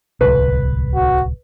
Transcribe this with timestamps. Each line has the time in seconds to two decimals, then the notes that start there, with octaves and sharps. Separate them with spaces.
0.21 D1 C2 B4
0.95 F#4